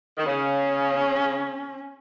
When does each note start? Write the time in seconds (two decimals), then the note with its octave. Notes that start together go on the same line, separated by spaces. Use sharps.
0.18 D#3
0.26 C#3 C#4